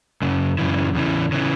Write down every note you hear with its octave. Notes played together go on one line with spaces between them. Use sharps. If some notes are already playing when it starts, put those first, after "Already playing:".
F#2 C#3
F#2 C#3 E3
E2 C#3 E3
C#3 E3